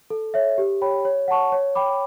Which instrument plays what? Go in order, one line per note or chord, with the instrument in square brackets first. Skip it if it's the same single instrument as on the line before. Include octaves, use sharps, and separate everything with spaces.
[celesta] A4
C#5 E5
G4
C#5 G5 B5
C#5
F#5 A5 C#6
C#5
G5 B5 D6